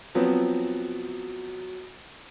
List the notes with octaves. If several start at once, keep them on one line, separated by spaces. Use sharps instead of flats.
F3 F#3 B3 C4